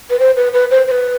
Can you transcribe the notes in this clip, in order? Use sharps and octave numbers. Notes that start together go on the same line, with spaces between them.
B4
C5
B4
B4
C5
C5
B4